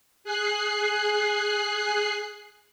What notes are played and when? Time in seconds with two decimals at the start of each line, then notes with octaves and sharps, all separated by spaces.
0.24 G#4 F#6 C7